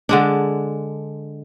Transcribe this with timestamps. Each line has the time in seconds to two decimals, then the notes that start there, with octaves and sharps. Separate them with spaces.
0.09 D3 G#3 D4